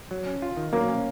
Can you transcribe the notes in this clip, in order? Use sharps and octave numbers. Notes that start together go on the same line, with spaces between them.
F#3
C#4
F4
D#3
F#3 A#3
C#4